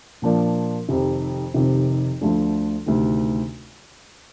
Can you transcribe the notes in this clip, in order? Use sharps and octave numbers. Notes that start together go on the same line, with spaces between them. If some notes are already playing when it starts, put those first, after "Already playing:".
A#2 F3 A#3 D4 F4
F1 F2 C3 D#3
F1 F2 C3 D#3
D2 D3 F3 A3 D4
D2 C3 D#3